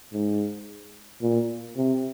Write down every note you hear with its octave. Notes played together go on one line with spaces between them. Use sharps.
G#2
A#2
C3